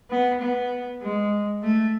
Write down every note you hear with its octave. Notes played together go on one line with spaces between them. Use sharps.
B3
B3
G#3
A3